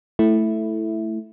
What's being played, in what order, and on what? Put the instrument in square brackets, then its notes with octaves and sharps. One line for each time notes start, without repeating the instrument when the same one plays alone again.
[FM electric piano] A3 E4